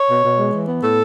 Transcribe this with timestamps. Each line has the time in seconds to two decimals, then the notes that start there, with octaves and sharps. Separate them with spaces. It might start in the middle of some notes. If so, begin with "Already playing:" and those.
Already playing: C#5
0.08 B2
0.23 B2
0.38 G#3
0.53 E3
0.68 B3
0.83 A2 A4